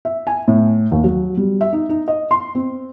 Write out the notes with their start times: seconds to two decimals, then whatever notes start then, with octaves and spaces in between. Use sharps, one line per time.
0.05 E5
0.27 G#5
0.48 A2
0.92 D#2
1.04 F#3
1.37 G3
1.61 E5
1.73 D#4
1.89 D#4
2.08 D#5
2.31 C6
2.55 C4